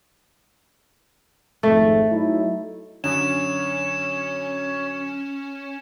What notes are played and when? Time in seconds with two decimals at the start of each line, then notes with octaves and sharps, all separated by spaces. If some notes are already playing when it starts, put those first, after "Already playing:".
1.63 G#1 F2 G#2 A3
2.10 F#3 D#4 E4
3.04 F#2 D3 C#4 C#5 E7